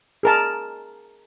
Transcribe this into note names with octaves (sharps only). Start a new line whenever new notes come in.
G#4 A#4 A5